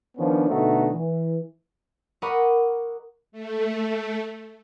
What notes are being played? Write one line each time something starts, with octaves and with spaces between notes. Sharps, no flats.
D#3 F3 B3 C#4 D4
B2 D3 A3 D#4 F#4
E3
A#4 D#5 F#5 B5 C#6 D6
A3